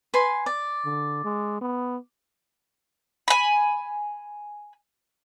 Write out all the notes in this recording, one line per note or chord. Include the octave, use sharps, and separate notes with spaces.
B4 G#5 C6
D5
D3
G#3
B3
G#5 B5